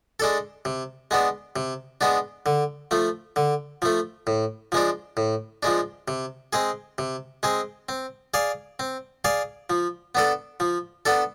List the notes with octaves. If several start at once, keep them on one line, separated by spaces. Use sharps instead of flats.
G#3 D4 A4
C3
G#3 B3 D4
C3
G#3 B3 D4
D3
F3 A3
D3
F3 A3
A2
F3 G#3 D4
A2
F3 G#3 D4
C3
G#3 C4 G#4
C3
G#3 C4 G#4
C4
G#4 D5 F5
C4
G#4 D5 F5
F3
B3 D4 A4
F3
B3 D4 A4